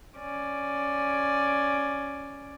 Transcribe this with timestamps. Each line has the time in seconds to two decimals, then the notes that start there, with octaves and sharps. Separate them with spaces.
0.17 C#4 D5